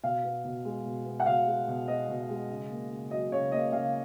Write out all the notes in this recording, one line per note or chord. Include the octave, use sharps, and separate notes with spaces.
B2 F5
B3
B2
G#3
B2
B3
F#5
B2 F5
G#3
B2
B3 D#5
B2
G#3
C#3
A#3
C#3
F#3 D#5
C#3 C#5
A#3 D#5
C#3 F5